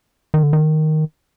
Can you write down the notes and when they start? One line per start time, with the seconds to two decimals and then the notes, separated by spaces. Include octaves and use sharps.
0.34 D#3
0.43 D3
0.53 D#3